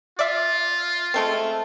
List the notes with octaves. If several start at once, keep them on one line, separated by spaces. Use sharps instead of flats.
F4 D5 E5
G#3 A3 C4